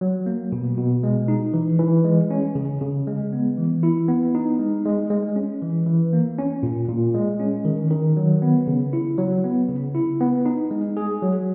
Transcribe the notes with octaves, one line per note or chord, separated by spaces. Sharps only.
F#3
A#3
B2
B2
G#3
D#4
E3
E3
G#3
C#4
C#3
C#3
G#3
B3
E3
E4
B3
D#4
G#3
G#3
G#3
C#4
E3
E3
A#3
C#4
A#2
A#2
G#3
C#4
D#3
D#3
F#3
B3
C#3
E4
F#3
B3
C#3
E4
B3
D#4
G#3
G#4
F#3